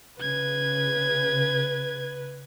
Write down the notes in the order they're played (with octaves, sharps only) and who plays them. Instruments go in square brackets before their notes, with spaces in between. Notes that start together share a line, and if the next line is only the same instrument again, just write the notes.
[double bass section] C#3 [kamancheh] B4 [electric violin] G#6